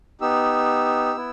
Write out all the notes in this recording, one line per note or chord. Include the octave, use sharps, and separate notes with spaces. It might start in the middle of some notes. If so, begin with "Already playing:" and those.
B3 D#4 G4 E6
B3 E4